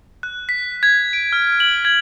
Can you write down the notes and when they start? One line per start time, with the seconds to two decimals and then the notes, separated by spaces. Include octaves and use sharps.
0.23 F#6
0.49 B6
0.83 G#6
1.13 D7
1.33 F6
1.60 F#7
1.85 G#6